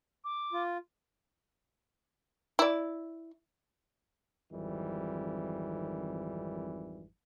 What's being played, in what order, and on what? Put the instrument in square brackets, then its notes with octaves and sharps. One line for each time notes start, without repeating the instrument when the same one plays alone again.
[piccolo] D6
[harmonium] F4
[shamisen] E4 D5
[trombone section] G#1 F2 D#3 E3 G3